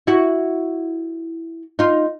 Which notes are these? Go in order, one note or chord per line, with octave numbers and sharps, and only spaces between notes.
E4 F#4
D#4 F4